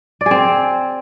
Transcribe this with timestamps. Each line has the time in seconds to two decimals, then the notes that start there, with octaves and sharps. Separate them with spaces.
0.21 D5
0.26 G#4
0.31 C4